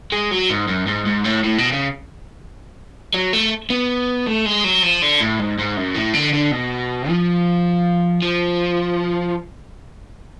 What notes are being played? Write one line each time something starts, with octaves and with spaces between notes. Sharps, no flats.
G#3
F#3
G#2
F#2
G#2
G#2
A2
A2
B2
C#3
F#3
A3
B3
A3
G#3
F#3
F3
D3
A2
G#2
G#2
F#2
A2
D3
D3
B2
F3
F3